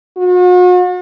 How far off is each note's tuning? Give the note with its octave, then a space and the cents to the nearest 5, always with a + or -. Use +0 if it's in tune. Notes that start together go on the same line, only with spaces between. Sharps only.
F#4 -45